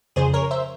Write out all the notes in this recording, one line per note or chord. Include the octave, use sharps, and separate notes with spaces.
F2 C#3 F3 G#4 C5
A#4 C#5
C5 E5